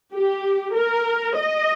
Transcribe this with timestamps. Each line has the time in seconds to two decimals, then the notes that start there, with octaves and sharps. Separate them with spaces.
0.14 G4
0.76 A#4
1.37 D#5